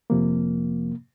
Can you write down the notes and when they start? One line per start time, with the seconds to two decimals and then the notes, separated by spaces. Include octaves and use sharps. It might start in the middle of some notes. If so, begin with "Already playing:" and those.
0.10 F2 C3 F3 A#3